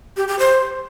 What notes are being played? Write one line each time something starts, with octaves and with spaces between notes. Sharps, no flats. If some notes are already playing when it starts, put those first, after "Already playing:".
G4
G4
C5